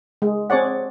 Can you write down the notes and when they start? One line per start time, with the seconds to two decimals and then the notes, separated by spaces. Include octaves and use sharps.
0.22 G#3
0.50 C4 G#4 C#5 D5 F#5